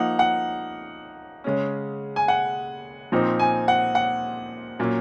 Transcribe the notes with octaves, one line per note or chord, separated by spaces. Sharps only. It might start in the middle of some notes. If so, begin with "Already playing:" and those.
Already playing: F3 A#3 D#4 F#5
F#5
C#3 G#3 C#4
G#5
F#5
A#2 F3 C4 D#4
G#5
F#5
F#5
A#2 F#3 C#4